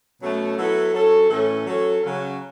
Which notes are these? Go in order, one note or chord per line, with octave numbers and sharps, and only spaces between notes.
B2 F#3 A3 C#4 A4
F#3 B3 E4 A4
F#3 C#4 A4
A2 E3 C#4 A4
F#3 C#4 A4
C#3 F#3 C#4